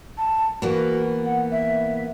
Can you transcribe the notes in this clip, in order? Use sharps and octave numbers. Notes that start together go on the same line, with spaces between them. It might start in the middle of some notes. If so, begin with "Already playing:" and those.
A5
E3 A#3 B3 F#4
F#5
E5